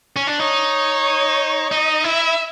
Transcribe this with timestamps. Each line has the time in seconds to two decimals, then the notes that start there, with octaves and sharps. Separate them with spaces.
0.16 C#4
0.27 D4
0.39 D#4 C#5
1.71 D#4 D#5
2.04 E4 E5